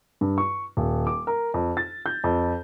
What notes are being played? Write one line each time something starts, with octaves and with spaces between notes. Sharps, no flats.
G2
C#6
D#1
D6
A#4
F2
A6
G6
F2